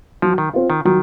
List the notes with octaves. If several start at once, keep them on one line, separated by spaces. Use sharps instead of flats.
F3 F#3
D#3
C4 F4
D#3
D#3 F#3